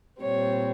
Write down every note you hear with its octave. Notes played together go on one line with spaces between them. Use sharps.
A#2 G3 C4 C#5